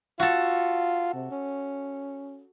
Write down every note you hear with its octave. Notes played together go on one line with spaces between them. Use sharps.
F4 F#4 A4
C3
C#4